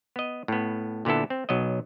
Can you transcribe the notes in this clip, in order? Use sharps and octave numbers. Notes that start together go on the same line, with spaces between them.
B3 D#5
A2 B3
A#2 D3 B3 E4 A4
C4
B1 F#3 B3 D#5